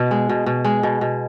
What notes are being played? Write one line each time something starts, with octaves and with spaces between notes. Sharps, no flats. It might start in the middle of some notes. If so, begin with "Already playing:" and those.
Already playing: B2 B3
G#3
B2
B2
G#3
B2
B2